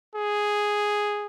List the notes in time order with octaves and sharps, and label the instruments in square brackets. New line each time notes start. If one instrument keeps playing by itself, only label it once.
[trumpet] G#4